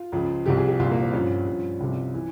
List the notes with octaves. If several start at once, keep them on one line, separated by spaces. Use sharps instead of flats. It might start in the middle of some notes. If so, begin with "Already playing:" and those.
Already playing: F4
C#2 C#3 F3
C2 C3 F3 G4
G#4
G4
C2 A#2 F3 F4
A#3
C4
G2 F3 C#4
G2 F3
C2 C3 F3
E3